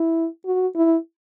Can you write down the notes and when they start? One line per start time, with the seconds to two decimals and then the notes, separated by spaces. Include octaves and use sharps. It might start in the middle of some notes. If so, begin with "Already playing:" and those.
Already playing: E4
0.46 F#4
0.75 E4